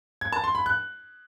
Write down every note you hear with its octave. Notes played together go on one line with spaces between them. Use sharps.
G#6
A5
C6
B5
F#6